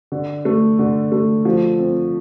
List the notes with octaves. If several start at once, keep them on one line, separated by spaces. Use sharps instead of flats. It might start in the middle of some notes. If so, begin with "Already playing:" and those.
D3
A3
D3
A3
F3
C4